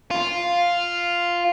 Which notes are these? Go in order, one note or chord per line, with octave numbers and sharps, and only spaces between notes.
F4